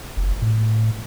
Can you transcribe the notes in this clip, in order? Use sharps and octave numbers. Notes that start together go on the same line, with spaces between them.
F#1
A2